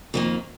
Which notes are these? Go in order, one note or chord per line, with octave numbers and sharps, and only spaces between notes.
F2 D#3 A#3